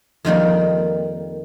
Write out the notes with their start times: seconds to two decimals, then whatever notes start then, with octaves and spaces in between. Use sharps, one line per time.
0.25 F2 D#3 G3 A#3